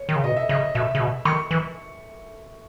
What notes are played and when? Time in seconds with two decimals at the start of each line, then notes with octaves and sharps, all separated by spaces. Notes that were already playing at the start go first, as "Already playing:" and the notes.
Already playing: C#5
0.09 D#3
0.16 C#3
0.24 B2 D#5
0.36 E5
0.49 C#3 D#5
0.75 B2 E5
0.95 C#3
1.00 B2
1.25 D#3 C#6
1.51 E3